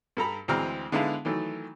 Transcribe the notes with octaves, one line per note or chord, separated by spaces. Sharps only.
G2 A4 A#5 B5
D2 E3 G#3 C4 A#5 F6
D3 G#3 B3 E4 F5 A5
D#3 E3 F#3 A3